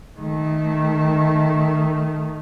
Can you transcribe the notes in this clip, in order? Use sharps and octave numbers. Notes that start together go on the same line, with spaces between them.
D#3 A3